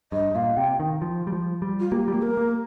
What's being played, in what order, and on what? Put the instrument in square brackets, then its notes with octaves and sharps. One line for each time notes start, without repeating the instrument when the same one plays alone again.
[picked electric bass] G2 [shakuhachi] D#5
[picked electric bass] A#2 [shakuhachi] F5
[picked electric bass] C3 [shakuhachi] G5
[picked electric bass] D#3
F3
G3
F3
G3
[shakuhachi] F4
[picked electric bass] A#3 [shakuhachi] G4
[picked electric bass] G3
A#3
[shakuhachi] A#4
[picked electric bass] A#3